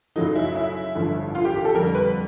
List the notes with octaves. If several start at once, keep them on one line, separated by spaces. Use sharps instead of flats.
F#2 C#3 F#3 A3 D#4
E4
E4
A1 G2 D3 F3 A3
F4
G4
G4
A4
F2 D3 G3 A#4
B4